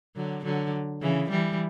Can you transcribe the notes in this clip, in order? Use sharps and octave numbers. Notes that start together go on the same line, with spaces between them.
D3 F#3
D3 F#3
C#3 E3
E3 G3